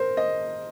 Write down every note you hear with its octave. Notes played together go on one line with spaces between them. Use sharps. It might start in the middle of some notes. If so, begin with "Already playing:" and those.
Already playing: A#4 C5
D#5